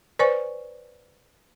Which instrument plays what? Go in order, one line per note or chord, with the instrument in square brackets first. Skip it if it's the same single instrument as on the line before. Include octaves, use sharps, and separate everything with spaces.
[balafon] B4 C5 D5 G#5 C#6